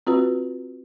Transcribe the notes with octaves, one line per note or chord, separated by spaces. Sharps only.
C4 F4 F#4 B4